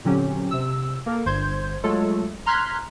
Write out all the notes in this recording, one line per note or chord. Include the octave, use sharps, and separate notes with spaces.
A#2 D3 F#3 C4 C#4 G4
C3 E6
A#3 A4 A#4
G1 G2 C5 C6 G6 G#6
F#3 G#3 A3 F4 A4 C#5
A#5 C6 F6 F#6 G#6 B6